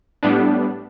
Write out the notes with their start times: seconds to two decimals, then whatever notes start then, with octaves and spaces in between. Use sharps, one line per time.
0.23 A2 G3 B3 D4